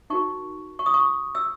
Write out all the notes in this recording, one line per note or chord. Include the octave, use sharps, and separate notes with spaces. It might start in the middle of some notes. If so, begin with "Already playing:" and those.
D#4 F#4 A#4 C#6
C#6
D#6
C#6
E6